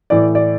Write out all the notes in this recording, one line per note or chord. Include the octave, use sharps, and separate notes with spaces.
A2 E3 D5
D5